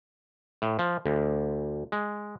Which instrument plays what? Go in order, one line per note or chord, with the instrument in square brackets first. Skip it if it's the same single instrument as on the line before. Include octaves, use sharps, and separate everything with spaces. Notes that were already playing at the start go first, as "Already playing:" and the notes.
[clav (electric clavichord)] A2
F3
D2
G#3